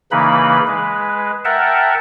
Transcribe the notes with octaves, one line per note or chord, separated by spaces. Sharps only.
C#3 E3 A#3 D#4 B4 B5
G#3 B4
A#4 E5 F#5 G5 A5